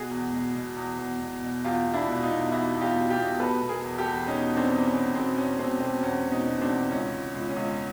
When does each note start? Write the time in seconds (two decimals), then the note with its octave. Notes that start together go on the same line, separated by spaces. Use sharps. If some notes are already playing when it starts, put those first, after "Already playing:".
Already playing: B2 F#4 G#4
0.11 E2
0.33 B2
0.55 B2
0.77 E2
0.99 E2
1.21 B2
1.43 B2
1.64 E2 F4 G4
1.86 B2
1.94 D4 E4
2.08 B2
2.23 D#4 F4
2.30 B2
2.52 E2 E4 F#4
2.74 E2
2.81 F4 G4
2.95 B2
3.10 F4 G4
3.18 B2
3.40 B2 A4 B4
3.62 B2
3.69 G#4 A#4
3.83 E2
3.98 G4 A4
4.05 E2
4.27 B2 C#4 D#4
4.49 E2
4.56 C4 D4
4.71 E2
4.86 C#4
4.94 E2
5.15 B2 C4
5.37 E2 C#4
5.59 B2 C4
5.80 B2 C4
6.03 E2 C#4
6.25 B2
6.31 C#4 D#4
6.47 B2
6.61 C4 D4
6.69 E2
6.90 C#2 C#4
7.13 C#2
7.34 C#2
7.49 C#4
7.56 C#2